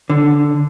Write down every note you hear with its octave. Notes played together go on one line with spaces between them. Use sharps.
D3